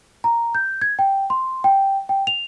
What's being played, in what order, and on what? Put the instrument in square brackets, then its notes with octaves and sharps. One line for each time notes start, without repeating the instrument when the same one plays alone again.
[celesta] A#5
G6
G#6
G5
C6
G5
G5
F7